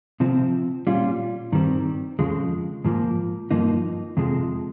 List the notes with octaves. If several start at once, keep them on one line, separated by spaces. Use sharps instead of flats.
C3 F3 C4
A#2 G3 C#4 F4
G2 D#3 G3 C4
F2 C#3 F3 G#3
G#2 F3 A#3
G2 F3 A#3 D#4
F2 C3 F3 G#3